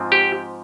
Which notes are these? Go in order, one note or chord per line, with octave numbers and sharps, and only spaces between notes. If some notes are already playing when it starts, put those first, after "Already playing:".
Already playing: G#2 F3 C4
G4